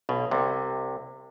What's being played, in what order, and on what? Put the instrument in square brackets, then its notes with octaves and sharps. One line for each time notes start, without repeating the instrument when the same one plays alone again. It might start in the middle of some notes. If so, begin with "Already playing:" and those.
[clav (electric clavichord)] B1 B2
C2 C3